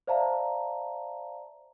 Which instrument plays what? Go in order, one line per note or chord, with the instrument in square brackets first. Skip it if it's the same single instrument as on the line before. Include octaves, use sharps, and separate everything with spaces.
[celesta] C5 D5 E5 F5 A5 A#5